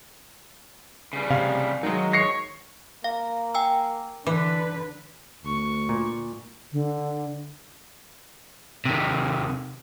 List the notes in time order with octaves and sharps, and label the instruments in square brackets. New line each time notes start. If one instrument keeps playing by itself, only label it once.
[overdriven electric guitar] C#3 G3
[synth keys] C3 [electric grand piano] F5
[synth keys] D#3 G#3 [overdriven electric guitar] F#3
[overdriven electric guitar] C#5 [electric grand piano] A#6 C7 C#7
[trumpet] A#3 [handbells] F5
[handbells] G5 G#5 E6
[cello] D3 B4 [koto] E3 [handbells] D6 F#6
[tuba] D2 [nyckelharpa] C#6
[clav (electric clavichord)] A#2
[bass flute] D3
[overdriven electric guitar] C3 D#3